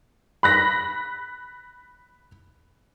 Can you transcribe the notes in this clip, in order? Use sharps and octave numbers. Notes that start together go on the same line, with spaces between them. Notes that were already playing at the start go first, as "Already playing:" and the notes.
B5 F#6 A#6 B6